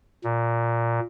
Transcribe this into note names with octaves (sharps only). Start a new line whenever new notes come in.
A#2